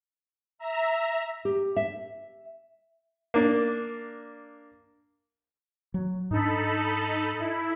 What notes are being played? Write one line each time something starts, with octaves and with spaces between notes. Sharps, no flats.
E5 A#5
G4
E5
A#3 D4
F#3
G#2 D4 D#4 A4 B5
E4